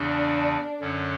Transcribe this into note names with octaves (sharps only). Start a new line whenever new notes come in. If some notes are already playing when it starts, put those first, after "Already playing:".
Already playing: E2 C#3 E3 D4
F#2 D3 F#3 C#4